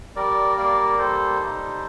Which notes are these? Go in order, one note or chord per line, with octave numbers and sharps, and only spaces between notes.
G3 A#4 D5
A#3 A#4 D5
G3 A4 C5
D#4